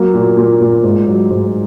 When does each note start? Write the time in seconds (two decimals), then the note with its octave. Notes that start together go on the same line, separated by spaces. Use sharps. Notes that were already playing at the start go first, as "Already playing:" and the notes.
Already playing: F#3 A#3
0.14 A#2
0.37 A#2
0.61 A#2
0.83 G#2
1.08 F#3
1.30 G#2